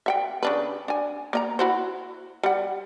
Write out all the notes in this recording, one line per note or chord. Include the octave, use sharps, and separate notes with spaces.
E5 F#5 G5
C#3 D4 B4
D4 G#5
A#3 D#5 A#5
E4 F#4 C5
G3 F#5